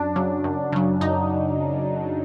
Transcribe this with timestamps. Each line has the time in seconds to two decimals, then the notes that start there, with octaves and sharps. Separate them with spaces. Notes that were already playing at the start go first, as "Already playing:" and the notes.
Already playing: F#2 D4
0.16 C#3 F#3
0.44 F#2
0.72 C#3 F#3
1.01 F#2 D#4